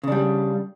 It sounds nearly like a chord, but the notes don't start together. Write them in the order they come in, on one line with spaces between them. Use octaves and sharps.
C#3 D4 G3